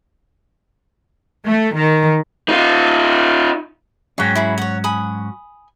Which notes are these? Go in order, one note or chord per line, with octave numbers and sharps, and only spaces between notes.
A3
D#3
D#4 F4
G#2 F#3 C#4 G#4 G5
E4 G#4 B5
C#5 F#5
G#5 B5 D#6